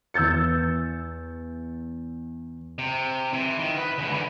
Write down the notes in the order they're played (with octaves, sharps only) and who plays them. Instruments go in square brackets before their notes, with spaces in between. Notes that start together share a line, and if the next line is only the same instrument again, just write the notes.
[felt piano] E2 E6 G6 A6 C#7
[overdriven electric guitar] C3
E3
D#3
B4
C#2 E3
D3 E3